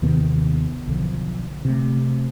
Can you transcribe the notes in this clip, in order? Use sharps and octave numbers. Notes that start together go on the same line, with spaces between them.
D#2 C3 D#3 B3
B1 D3 F3
C3 A3